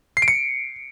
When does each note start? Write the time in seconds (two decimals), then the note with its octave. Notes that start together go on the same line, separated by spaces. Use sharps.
0.17 C7
0.22 D7
0.28 C#7